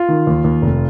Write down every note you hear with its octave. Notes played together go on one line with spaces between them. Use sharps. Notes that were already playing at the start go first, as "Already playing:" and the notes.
Already playing: F4
D#3
D#2
D#2
F1